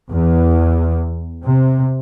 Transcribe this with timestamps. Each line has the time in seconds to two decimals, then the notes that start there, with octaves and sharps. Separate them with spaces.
0.10 E2
1.45 C3